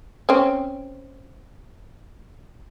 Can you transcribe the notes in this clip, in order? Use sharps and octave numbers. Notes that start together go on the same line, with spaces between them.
C4 C#4